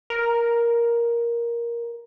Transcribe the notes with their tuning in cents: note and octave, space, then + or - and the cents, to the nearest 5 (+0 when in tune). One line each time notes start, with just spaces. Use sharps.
A#4 +10